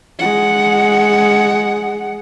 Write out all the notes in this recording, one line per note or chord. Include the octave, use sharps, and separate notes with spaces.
G#3 F#5